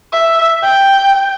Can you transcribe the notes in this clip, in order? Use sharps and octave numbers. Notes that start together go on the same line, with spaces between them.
E5
G5